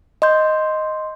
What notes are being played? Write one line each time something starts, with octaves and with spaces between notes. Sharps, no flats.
D#5 C6 G6